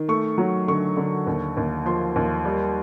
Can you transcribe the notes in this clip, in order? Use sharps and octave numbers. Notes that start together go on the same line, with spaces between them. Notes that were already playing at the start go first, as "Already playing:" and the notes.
Already playing: D#3
A3 C#6
F#3
D3 C#6
D3
D#2
D#2
F3 C6
D#2
G3